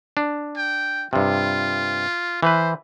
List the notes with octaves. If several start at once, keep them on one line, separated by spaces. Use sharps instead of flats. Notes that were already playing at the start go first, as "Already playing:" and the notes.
D4
G5
G2 C3 F4
E3 B4 C5